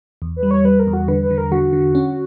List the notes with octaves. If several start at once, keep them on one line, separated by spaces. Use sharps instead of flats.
E2
B4
G3
C#5
G3 B4
A#4
E2
F#4
D3 B4
B4
D3
A#4
D3 F#4
D3
C#4